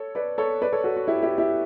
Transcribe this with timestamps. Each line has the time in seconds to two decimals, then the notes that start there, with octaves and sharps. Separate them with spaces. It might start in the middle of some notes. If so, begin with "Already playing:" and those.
Already playing: A4 C#5
0.15 B4 D5
0.38 A4 C#5
0.61 B4 D5
0.72 A4 C#5
0.84 F#4 A4
0.96 F#4
1.08 E4 G4
1.22 E4 G4
1.38 E4 G4